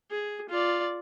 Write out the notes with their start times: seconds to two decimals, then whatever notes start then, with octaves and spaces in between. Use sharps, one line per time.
0.11 G#4
0.49 F4 D5